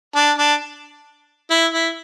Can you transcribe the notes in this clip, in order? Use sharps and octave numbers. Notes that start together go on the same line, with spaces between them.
D4
D4
E4
E4